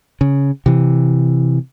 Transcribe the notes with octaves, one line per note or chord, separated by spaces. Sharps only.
C#3
C3 E3